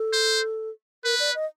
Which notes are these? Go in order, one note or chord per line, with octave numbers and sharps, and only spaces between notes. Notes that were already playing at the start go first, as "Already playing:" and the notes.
Already playing: A4
C5
A#4 B4
D5
D#5